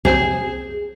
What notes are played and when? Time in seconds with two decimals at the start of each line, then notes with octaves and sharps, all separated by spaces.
0.05 C2 C4 G#4 C7